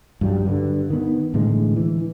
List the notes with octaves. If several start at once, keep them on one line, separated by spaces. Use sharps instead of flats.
G2 F#3 G3
G2 D3
D#3 B3
A2 D3 E3 G#3
E3